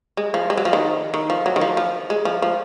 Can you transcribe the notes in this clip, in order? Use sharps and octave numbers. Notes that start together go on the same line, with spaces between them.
G#3
F3
G#3
F#3
F3
D#3
D#3
F3
F#3
D#3
F3
F3
G#3
F3
F3